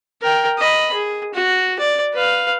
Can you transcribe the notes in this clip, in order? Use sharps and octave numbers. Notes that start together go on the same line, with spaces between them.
A#4 G5
D#5 B5
G#4
F#4
D5
B4 F5